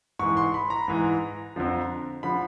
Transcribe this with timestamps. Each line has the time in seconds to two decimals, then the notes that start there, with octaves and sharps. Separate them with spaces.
0.19 G#2 E3 C#6
0.37 C6
0.54 B5
0.70 A#5
0.88 G#2 E3
1.56 F2 D3 F3
2.23 D3 F3 B5